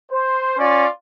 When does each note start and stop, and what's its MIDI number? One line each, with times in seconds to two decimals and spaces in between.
0.11 0.56 72
0.58 0.86 61
0.58 0.86 65
0.58 0.86 74